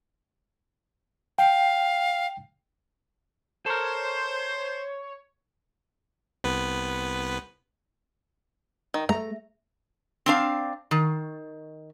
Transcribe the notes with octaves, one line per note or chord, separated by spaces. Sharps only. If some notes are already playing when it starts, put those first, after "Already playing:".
F5 G5
A4 A#4 C5 C#5
C2 B3 B4
D#3
A3 A#5
C4 D4 F5
D#3